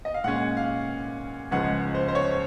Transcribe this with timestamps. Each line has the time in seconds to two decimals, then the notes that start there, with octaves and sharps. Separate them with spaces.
0.05 D#5
0.14 F5
0.24 A#2 G#3 C#4 F#5
0.57 F5
1.51 C#2 C#3 F3 G#3 C#4 F#5
1.95 C5
2.08 C5
2.15 C#5